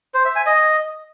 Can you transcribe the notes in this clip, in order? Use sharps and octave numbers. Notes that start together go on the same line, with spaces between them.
C5
E5
G#5
D#5